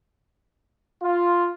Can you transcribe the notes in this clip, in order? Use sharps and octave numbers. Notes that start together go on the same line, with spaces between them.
F4